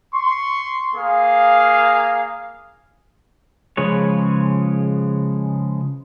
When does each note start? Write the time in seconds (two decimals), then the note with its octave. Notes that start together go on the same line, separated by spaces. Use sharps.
0.14 C6 C#6
0.95 A#3 G#4 F5
3.77 C#3 F3 G#3 B4 C#5